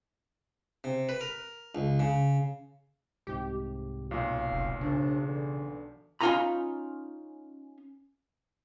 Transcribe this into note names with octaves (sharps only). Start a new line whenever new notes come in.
C3
B4
A#4
C#2
C#3
C2 G#2 C3 G4
B1 A#2 C#4 F5
F1
F#2 C#3 F3 D4
D3 E3
C#4 D#4 F4 G#5 A#5 B5